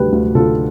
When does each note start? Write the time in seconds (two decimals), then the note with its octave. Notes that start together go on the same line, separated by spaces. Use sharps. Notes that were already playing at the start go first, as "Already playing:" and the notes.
Already playing: D2 D3 G3 G4 B4
0.13 D2
0.35 D3 F4 A4